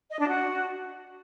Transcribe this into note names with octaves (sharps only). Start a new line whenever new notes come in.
D#5
D4
F#4